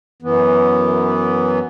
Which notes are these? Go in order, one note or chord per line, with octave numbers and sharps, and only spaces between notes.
F#2 E3 B3